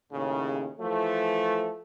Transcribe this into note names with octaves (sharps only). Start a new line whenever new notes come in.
D#2 A2 C#3
E3 F3 A3